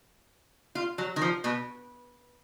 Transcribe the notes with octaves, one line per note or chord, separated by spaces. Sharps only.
F4
F#3
D#3
F3
B2